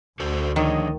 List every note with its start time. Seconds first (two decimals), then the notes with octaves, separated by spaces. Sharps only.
0.20 D2 F#4 A4 C5
0.56 D#3 F3 D4 A#4 C#5 D#5